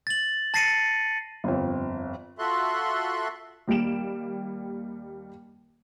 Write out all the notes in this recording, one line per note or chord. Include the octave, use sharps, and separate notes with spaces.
A6 F#7
A5 A6 A#6 C7 C#7 D#7
G1 F2
F4 F#4 A4 E5 C6 F#6
D#2 G3 A#3 D7 E7